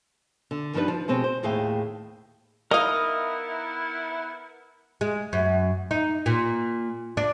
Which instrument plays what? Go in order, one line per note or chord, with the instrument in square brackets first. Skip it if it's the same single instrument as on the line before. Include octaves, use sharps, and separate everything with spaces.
[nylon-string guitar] D3
G2 F3 G3 D4 D#4 B4
F3
B2 G#3 C4 G4 C#5
C5
D#2 A2 G#4 F5 G5
[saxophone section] B3 E4 [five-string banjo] D#4 F5 [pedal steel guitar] A#4 D#6
[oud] G#3
F#2
D#4
A#2
D4